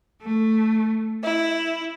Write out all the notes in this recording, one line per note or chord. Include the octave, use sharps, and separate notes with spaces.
A3
E4